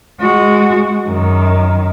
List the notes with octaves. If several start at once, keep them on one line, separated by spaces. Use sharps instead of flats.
G#3 F#4
F#2 D#3